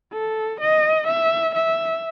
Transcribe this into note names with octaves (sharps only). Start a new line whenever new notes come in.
A4
D#5
E5
E5